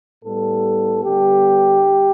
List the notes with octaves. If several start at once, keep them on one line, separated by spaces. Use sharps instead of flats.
A2 G3 B3 A4
D3 G3 B3 G4